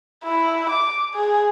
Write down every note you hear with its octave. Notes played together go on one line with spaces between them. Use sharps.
E4
D6
G#4